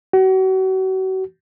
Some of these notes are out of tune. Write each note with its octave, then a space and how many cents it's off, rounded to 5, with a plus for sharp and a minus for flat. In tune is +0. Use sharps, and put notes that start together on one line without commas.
F#4 +35